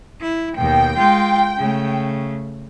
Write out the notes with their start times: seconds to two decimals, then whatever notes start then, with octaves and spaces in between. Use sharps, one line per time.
0.21 E4
0.57 D#2 B2 G5
0.97 G#3 F4
1.57 C#3 A3